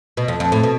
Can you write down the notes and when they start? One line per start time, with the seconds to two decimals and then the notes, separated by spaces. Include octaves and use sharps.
0.17 B2
0.28 F2
0.40 F2
0.52 A2
0.63 B2